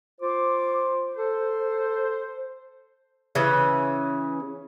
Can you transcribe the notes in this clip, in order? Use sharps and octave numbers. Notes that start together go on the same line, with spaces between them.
F4 C5 D6
A4 C5
C#3 E3 C#4